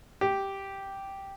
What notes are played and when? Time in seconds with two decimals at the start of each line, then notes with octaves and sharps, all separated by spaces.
0.21 G4